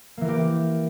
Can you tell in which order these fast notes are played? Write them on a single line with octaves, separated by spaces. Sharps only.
A#3 E3 A#4 G4